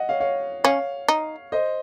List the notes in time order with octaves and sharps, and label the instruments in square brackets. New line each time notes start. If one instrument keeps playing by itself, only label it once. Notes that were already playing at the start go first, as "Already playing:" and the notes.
Already playing: [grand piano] D#5 F#5
C#5 F5
C#5 F5
[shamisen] C#4 [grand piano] C#5 F5
[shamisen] D#4
[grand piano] C5 D#5